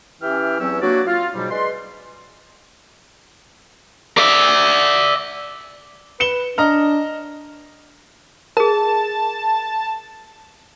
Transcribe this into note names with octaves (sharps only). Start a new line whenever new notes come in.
E3 C#4 G4 E5 G5 F6
E2 F#3 C4 C#4 E6
F#3 A#3 D4 F#4 D5
F4
G#2 B2 F#3 G3
G#3 B4 D5 C6
D5 E5
B4 C#7 E7 G7
D4 D#5 A#5 F6
G#4 A#4 A5